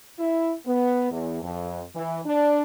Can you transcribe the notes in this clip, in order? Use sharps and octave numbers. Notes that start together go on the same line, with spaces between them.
E4
B3
E2
F2
E3
D4